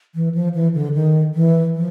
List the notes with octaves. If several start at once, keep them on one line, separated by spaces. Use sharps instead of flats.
E3
F3
E3
D3
D#3
E3
F3